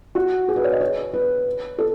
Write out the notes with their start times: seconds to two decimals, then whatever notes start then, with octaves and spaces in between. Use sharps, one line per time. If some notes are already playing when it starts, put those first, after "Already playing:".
0.15 F#4
0.48 G#4
0.56 B4
0.64 C#5
0.72 D#5
0.81 C#5
1.14 B4
1.78 A4